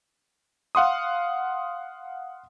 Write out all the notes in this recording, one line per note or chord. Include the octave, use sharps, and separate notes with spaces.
F5 F#5 C6 D#6